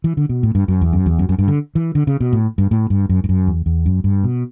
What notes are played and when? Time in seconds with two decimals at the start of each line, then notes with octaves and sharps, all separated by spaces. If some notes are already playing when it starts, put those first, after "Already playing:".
0.04 E3
0.17 D3
0.29 B2
0.43 A2
0.55 G2
0.68 F#2
0.81 E2
0.93 F#2
1.06 E2
1.19 F#2
1.29 F#2
1.39 G2
1.48 D3
1.75 E3
1.95 D3
2.07 C#3
2.20 B2
2.33 A2
2.58 G2
2.71 A2
2.90 G2
3.09 F#2
3.24 G2
3.29 F#2
3.47 E2
3.66 E2
3.86 F#2
4.04 G2
4.24 B2